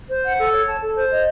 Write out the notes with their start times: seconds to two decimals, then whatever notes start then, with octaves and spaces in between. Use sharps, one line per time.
0.09 C5
0.23 F#5
0.38 A4
0.52 C#5
0.66 A5
0.81 A4
0.96 C5
1.11 D#5